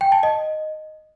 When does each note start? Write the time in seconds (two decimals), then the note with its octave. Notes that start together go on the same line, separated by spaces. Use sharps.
0.01 G5
0.12 A5
0.23 D#5